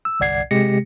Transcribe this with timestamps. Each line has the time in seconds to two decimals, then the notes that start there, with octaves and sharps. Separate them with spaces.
0.05 E6
0.20 G1 C2 D5 F#5 G#6 C7
0.51 C3 G#3 G4 A#6 C#7